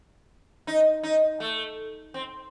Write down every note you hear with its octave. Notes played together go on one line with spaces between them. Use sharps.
D#4
D#4
A3
C4